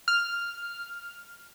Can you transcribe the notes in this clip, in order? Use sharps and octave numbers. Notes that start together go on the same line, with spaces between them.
F6